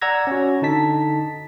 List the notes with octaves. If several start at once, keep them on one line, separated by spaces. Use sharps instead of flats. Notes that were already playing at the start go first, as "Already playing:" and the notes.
D5 F#5 A#5 E6 G#6 A#6
C#4 F#4
D3 D#4 A5 B6